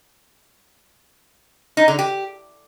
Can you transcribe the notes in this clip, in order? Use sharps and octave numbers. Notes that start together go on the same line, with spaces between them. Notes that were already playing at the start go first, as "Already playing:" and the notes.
D#4
D3
G4